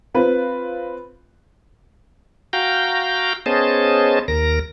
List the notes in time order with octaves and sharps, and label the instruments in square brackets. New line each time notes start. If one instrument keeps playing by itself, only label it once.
[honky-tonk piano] C4 F4 B4
[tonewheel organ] F#4 F5 G5 A#5 G6
B3 C#4 G#4 C5 D#5 A5
D#2 A#4 A#6